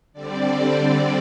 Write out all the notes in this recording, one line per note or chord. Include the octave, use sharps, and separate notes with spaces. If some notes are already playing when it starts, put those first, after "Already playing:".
D3 G3 C4 D5